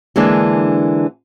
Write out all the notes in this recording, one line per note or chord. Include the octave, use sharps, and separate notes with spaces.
D3 E3 G#3 A#3 D4